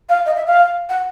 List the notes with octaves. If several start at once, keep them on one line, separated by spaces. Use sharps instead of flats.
F5
D#5
E5
F5
F#5